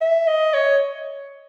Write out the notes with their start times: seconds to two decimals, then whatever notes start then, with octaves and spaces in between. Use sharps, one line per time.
0.01 E5
0.27 D#5
0.54 C#5